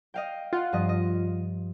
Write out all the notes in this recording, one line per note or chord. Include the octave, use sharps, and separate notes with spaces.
D#5 F5 G5
F4 F#5
G2 F3 D#5
D#5